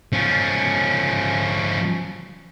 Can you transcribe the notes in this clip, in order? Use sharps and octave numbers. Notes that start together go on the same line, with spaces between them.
F3 C#4